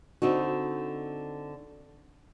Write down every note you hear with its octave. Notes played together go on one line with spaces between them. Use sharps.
D3 C4 D#4 F#4